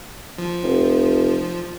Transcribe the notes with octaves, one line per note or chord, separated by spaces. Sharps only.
F3
F1